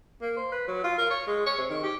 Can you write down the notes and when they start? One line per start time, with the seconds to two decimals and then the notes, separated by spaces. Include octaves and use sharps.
0.22 A#3
0.37 C5
0.52 B4
0.68 F#3
0.83 F4
0.98 A#4
1.10 C#5
1.27 G#3
1.46 C#5
1.57 C3
1.70 D#3
1.83 G4